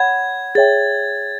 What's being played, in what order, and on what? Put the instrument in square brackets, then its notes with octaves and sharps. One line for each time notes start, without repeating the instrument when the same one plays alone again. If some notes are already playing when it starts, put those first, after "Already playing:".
Already playing: [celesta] C#5 F#5 B5 [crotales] G#6
[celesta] G#4 C#5 E5 G5 [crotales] A6